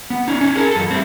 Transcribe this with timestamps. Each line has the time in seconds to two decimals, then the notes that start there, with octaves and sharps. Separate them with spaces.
0.10 B3
0.28 C#4 D#4
0.41 C#4 D#4
0.56 G#4 A#4 A5
0.71 F#2 A4
0.91 G3 A3 C4